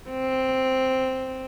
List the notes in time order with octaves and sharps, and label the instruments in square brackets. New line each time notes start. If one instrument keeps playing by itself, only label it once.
[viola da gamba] C4